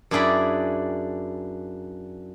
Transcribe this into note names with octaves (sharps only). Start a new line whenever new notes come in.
F#2 D4 E4 G#4 D5 B5